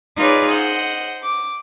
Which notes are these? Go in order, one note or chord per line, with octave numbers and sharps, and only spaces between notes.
D#4 F4 G#4 B4 C#5 D5
C5 D#5 F#5
D6